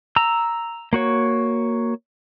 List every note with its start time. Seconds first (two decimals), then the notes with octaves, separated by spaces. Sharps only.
0.16 A#5 E6
0.93 A#3 F#4 C#5